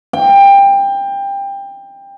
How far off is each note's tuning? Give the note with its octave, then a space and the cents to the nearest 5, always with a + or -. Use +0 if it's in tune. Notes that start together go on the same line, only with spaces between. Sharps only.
G5 +20